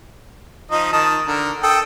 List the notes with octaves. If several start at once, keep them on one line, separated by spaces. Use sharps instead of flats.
F3 D#4 D#5
D#3 A5 D#6
D3 A#4
A4 G5 D#6